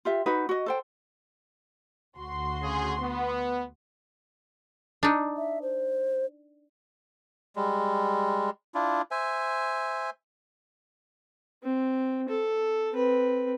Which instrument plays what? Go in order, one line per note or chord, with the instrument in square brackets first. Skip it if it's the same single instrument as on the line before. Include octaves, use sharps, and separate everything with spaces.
[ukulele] F4 G4 E5
D#4 F#4 B4
F#4 D#5
A4 C5 G5
[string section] D2 F#4 C6
[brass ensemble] C#3 G#4
B3
[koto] D4 D#4
[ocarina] E5
C5
[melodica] G3 G#3
D4 E4 F4
C5 E5 G#5
[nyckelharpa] C4
A4
C4 B4